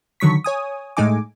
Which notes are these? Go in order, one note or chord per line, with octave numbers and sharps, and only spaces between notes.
D3 D#3 F#3 C#6 B6
C#5 G#5 D#6
A2 G#3 A3 D#4 G#5 D6